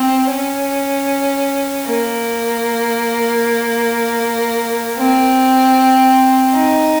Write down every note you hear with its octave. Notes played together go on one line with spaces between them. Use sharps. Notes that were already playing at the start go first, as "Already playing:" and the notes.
Already playing: C4
C#4
A#3
C4
D#4